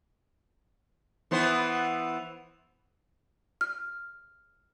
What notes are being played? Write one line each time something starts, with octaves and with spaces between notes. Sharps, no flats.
E3 B3 C5
F6